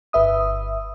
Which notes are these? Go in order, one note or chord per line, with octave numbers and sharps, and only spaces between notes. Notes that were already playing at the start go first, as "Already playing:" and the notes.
G1 B4 E5 D#6